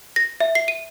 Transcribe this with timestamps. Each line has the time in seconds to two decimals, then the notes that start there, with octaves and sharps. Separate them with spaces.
0.16 A#6
0.40 E5
0.55 C7
0.68 D#7